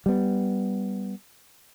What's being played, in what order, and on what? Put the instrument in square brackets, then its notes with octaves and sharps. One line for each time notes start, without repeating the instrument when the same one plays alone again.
[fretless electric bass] G3 B3